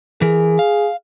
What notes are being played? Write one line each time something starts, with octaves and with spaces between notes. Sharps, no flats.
E3 G#4 A#4
F5